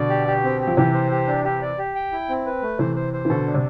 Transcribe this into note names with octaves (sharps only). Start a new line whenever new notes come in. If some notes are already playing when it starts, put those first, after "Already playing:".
Already playing: B2 D3 D5
G4
G4
C4
G4
F3
C3 E3 G4
C5
G4
D4
G4
D5
G4
G5
E4
C4
B4
A3
C3 E3 C5
C5
C5
E3
B2 D3 A4
D4
C3